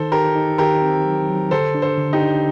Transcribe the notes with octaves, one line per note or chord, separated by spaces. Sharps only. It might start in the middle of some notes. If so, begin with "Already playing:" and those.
Already playing: D#3 D#4 A4 C5
D#4 G4 A#4
D#4
D#3 G4 A#4
C4
F#3
F#3
D3 A4 C5
D4
A4 C5
D3
D#4 G4
D4